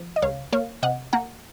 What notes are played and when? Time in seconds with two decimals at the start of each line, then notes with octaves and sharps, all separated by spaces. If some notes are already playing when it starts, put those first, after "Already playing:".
Already playing: F3
0.16 D#5
0.22 C#2 C#5 F5
0.52 A#3 C#5 F5
0.83 C3 D#5 F#5
1.13 A#3 F#5 A#5